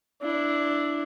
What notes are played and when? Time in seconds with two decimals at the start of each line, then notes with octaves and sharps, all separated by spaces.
0.22 D4 E4